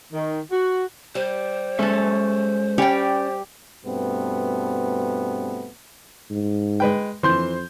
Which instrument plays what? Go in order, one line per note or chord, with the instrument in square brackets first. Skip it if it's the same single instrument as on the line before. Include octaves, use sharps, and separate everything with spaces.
[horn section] D#3
F#4
[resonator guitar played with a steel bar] G3 [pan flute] C5
[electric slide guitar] G#3 A4 E5 [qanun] C#4 A5
[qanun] G3 G4 [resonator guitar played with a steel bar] C#4 D5 G5
[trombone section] G2 B2 A3 B3 C4
[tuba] G#2
[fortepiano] G#3 B4 G5
[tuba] F2 [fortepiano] E3 [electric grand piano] C5 C6 G6